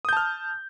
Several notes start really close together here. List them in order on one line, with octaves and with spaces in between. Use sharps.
D#6 G6 A5 F6